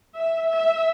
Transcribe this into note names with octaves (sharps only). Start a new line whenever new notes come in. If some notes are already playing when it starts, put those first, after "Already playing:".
E5
E5